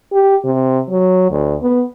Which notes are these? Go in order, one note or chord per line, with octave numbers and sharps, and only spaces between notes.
G4
C3
F#3
D2
B3